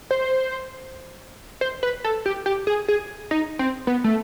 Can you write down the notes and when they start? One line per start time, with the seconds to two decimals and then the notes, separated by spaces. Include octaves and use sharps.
0.11 C5
1.61 C5
1.83 B4
2.04 A4
2.26 G4
2.46 G4
2.67 G#4
2.88 G#4
3.31 D#4
3.59 C4
3.87 B3
4.04 A3